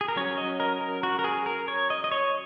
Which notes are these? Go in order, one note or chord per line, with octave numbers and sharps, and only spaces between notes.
G#4
A#4
F#3 C#4 C#5
D#5
A#4
A#4
F#4
A#4
G#4
A#4
C#5
D#5
D#5
C#5